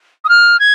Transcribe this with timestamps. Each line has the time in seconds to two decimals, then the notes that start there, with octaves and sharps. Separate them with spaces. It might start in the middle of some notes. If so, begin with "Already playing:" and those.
0.25 D#6
0.29 F6
0.60 G#6